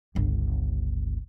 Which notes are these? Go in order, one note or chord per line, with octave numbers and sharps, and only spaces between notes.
G1 C#2